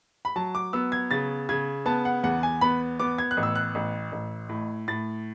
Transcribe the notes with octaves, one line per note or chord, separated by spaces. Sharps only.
B5
F#3 A5
D6
B3 E6
G#6
C#3 A6
C#3 G#6
B3 A5
F#5
E2 F#5
G#5
B3 B5
B3 D6
G#6
F#6
A1
E6
F#6
A1
A1
A2
A2 A6